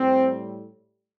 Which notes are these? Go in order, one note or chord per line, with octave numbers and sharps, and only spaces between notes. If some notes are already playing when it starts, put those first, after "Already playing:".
Already playing: A2 G3 C4